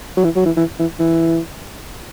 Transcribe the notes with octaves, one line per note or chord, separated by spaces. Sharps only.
F#3
E3
F#3
E3
E3
E3
E3